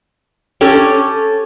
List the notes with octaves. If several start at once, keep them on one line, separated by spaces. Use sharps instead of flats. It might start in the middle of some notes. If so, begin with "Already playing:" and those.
C#4 G4 A4